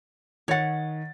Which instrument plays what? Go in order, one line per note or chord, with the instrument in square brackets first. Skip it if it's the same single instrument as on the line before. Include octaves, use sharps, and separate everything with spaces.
[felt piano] D#3 A6 [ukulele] C#5 F#5